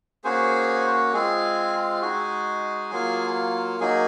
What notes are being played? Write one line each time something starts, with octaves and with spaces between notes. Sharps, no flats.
A#3 C#4 F#4 G#4 C5
G#3 C4 F4 G#4
G#3 D#4 F#4 G#4
F#3 A#3 F4
F#3 A#3 D#4 G#4